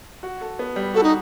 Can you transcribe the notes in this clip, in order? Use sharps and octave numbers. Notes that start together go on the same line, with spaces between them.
F#4
A4
B3
G3
F#4 A4
D#4